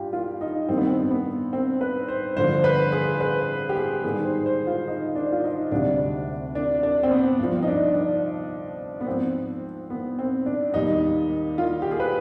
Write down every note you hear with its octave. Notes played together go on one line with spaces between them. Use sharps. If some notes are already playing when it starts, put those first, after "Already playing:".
Already playing: G2 F4 G4
F4
D#4
G2 D#3 G3 C4
B3
C4
B3
C4
B4
C5
G2 D3 F3 C5
B4
G#4
B4
G4
G#4
G#2 D#3 G3 G#4
C5
C5
F4
D#4
D4
F4
D#4
D2 C3 G3 D4
D4
D4
C4
B3
G2 F3
D#4
D4
D4
B3
G#2 F3 C4
B3
C4
D4
D#2 D#3 G3 D#4
F4
G4
G#4
B4